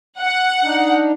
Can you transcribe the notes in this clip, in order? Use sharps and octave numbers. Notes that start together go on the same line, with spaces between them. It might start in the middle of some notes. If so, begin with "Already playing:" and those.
F#5
D4 D#4